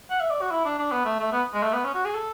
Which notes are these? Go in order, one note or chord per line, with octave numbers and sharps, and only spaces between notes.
F#5
E5
D5
F#4
E4
D4
D4
B3
A3
A3
B3
G#3
A3
B3
C#4
F#4
G#4
A4